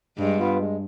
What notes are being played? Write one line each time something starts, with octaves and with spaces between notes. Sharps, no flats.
G2 G#3
B3 F4 B4
G#3